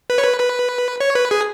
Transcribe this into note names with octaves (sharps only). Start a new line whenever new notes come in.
B4
C#5
B4
B4
C#5
B4
G#4